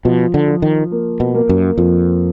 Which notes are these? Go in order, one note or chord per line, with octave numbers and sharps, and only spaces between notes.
B2 F3
D3
F3
D#3
A#3
B2
A#3
F#2
F2 F3